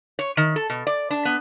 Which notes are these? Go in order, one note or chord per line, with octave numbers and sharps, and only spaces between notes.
C#5
D#3
A4
B2
D5
D4
B3